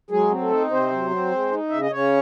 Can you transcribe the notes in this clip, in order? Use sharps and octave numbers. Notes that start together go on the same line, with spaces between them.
F#3 G#3 G#4
C4
A3 A4
D#4
C3 C4 C5
F#3
C4
G#3
D#4
C#3 E5
D#5
C#3 C#4 C#5